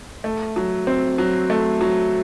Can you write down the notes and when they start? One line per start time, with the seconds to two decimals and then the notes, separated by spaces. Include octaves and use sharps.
0.24 A3
0.56 F#3
0.87 C4
1.18 F#3
1.50 A3
1.81 F#3